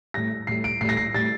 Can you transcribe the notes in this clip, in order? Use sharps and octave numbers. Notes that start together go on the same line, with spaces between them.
A2 G3 A#6
A2 G3 C7
D7
A2 G3 A#6 C7
C7
A2 G3 A6